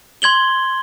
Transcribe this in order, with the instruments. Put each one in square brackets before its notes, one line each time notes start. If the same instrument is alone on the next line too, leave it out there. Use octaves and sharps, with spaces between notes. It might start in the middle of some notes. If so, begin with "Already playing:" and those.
[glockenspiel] C6 G#6 F#7 G7